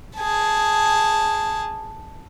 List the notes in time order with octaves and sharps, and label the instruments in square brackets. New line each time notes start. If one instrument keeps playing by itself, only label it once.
[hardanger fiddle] G#4 A5